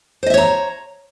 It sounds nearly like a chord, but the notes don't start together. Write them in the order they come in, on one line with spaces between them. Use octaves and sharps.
C5 D#5 E5 C#5 A#5